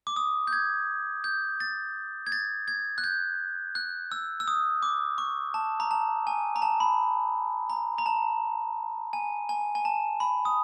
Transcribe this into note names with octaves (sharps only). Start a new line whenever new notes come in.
D6
D#6
G6
G#6
G6
A6
G#6
A6
G#6
F#6
G6
F#6
E6
E6
D#6
D6
C#6
A5
A#5
A5
G#5
A#5
A5
B5
A#5
A#5
A5
G#5
G#5
G#5
A5
B5
D#6